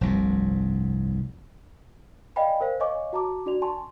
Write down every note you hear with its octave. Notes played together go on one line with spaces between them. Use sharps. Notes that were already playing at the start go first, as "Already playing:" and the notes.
F1 C2 G2
D5 D#5 F5 G5 G#5 B5
A#4 C5 F5
C#5 D#5 F5 G#5 C#6 D6
F#4 A5 A#5 D6
D4 F#4 D5 F7
G#5 A5 C6 C#6